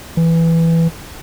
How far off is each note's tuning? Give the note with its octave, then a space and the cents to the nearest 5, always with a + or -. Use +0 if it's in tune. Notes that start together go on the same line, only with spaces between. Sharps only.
E3 +5